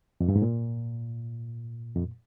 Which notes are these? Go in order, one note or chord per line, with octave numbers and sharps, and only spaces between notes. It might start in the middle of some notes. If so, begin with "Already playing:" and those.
F2
G2
G#2
A#2
F2